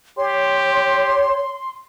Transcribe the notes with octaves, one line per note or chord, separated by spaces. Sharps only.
G4 C#5 C6